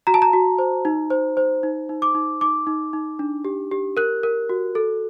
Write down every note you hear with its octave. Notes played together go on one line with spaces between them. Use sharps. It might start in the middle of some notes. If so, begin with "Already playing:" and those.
F#4 A#5
A5
A#5
F#4
C5
D#4
C5
C5
D#4
D#4
D6
D#4
D#4 D6
D#4
D#4
D4
G4
G4
A#4 F#6
A#4
F#4
A4